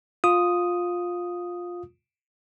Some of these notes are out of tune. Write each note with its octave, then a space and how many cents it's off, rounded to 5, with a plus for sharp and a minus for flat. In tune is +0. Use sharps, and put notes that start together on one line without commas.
F4 +15 D#6 +0